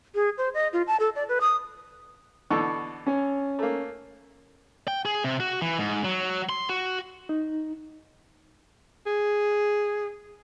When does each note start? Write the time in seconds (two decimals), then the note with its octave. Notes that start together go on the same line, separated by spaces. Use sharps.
0.15 G#4
0.38 C5
0.54 D#5
0.73 F4
0.87 A5
1.00 A4
1.15 D5
1.29 B4
1.41 D#6
2.50 B2 D3 E3 C#6
3.06 C#4 C#5 G#5
3.59 A3 A#3
4.88 G5
5.05 G#4
5.24 C3
5.40 F#4
5.62 E3
5.79 G#2
6.04 F#3
6.49 C6
6.69 F#4
7.29 D#4
9.06 G#4